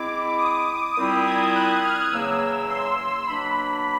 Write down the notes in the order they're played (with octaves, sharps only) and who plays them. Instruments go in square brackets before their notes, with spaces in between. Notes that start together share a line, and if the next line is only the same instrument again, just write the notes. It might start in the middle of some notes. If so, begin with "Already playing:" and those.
Already playing: [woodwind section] G#3 C4 E4 [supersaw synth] D6
[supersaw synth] D#6
[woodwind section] A#2 G3 C4 E4 [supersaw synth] D#6
[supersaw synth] G#6
F#6
F6
[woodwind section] E2 C#3 F#3 A#3 C#4 [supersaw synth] E6
[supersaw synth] E6
C6
[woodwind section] B2 F#3 A#3 D4 [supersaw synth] B5